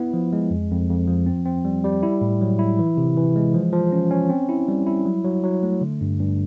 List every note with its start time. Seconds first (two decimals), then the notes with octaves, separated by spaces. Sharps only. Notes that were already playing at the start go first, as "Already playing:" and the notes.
Already playing: B3 E4
0.14 F3
0.33 G#3
0.51 F2
0.71 F2
0.90 F2
1.08 F3
1.26 C4
1.45 C4
1.65 G3
1.84 G3
2.03 E4
2.21 A2
2.41 F#3
2.59 E4
2.79 E3
2.97 C3
3.17 E3
3.36 G#3
3.54 F3
3.73 F3
3.92 C#4
4.11 C#4
4.29 C4
4.49 E4
4.68 G3
4.86 E4
5.05 F#3
5.24 F#3
5.44 F#3
5.63 A3
5.81 D3
6.01 G2
6.20 G2